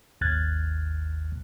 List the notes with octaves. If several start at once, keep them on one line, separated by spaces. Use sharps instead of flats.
G#1 D#2 F6 F#6 G#6 A6